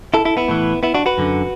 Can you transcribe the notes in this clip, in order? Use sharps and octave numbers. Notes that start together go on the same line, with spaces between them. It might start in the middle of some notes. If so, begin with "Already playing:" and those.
E4 A4
E4 A4
B3 E4
A2 E3
B3 E4
D4 F#4
F#4 B4
F#2 D3